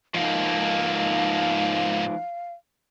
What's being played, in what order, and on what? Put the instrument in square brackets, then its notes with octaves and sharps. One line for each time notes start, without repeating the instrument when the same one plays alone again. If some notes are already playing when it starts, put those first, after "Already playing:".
[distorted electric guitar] G#2 A#3 [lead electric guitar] F3 D#4 [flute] F5